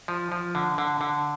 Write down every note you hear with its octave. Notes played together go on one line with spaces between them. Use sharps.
F3
F3
D3
D3
D3